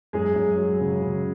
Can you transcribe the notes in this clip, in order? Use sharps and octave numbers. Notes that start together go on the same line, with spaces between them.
F#2 G#3 G#4
F#2
F#3
C#3
C#3